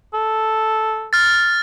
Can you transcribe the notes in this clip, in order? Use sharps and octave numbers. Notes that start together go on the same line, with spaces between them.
A4
F6 A6